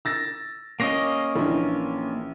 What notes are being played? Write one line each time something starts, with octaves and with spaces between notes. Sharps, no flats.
E6 A6 A#6
A#3 C#4 D#5 A#6 C7
A#1 E3 D4